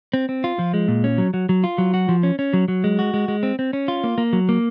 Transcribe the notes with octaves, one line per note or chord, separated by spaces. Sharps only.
C4
C4
F4
F3
G#3
A#2
C#4
F#3
F#3
F#3
F4
F#3
F#4
F3
C#4
C#4
F#3
F#3
G#3
F#4
G#3
G#3
C4
C4
C#4
F4
A#3
A#3
F#3
A#3